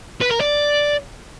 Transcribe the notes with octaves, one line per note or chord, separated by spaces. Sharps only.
B4
A#4
D5